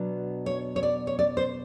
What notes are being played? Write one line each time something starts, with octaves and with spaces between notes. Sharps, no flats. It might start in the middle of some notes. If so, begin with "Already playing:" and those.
Already playing: B2 F#3 B3 D4
C#5
C#5
D5
C#5
D5
C5